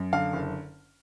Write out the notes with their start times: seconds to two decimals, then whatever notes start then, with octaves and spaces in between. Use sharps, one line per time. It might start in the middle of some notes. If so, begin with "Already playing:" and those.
Already playing: F#2
0.13 D3 F5
0.33 F#1